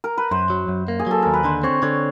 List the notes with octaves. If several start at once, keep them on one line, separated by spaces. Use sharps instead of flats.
A#4
B4
F#2 C5
F#3
F#2
A#3
G#4
F#3 A4
D#2 A#4
B4
D3 C5
C4 C#5
D3 C#5